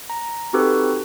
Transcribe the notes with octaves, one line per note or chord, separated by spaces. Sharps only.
A#5
C4 D#4 F#4 G4 A4 B4